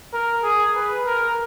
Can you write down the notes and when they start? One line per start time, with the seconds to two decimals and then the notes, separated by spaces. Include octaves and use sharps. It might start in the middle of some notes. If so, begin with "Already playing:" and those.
0.13 A#4
0.43 G#4
0.75 B4
1.06 A#4